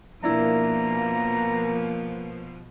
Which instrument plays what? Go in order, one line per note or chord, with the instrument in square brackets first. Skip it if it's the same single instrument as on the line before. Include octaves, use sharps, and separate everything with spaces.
[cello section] B2 F3 [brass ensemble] A#3 [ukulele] D4 E4 [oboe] A#5